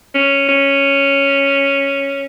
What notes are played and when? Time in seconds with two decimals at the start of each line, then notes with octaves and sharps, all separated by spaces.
0.15 C#4
0.49 C#4